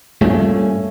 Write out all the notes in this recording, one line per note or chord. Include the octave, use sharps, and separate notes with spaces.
G2 A#2 A3 C#4